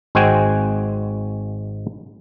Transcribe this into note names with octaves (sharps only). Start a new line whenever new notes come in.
G#1 G#3 C4 F#4 G5 G#5